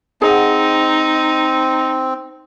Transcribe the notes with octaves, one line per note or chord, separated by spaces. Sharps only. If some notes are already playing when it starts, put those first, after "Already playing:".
C4 D#4 G#4 F#5